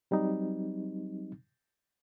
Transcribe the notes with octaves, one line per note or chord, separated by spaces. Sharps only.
F#3 G3 C4 D#4